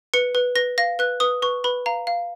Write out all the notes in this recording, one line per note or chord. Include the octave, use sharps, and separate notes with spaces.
B4 C#7
B4
B4 A#6
F5 A#6
B4 F#6
B4 D#6
B4 C#6
B4 B5
F5 A#5
F5